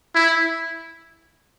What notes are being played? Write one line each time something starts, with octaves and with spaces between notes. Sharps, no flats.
E4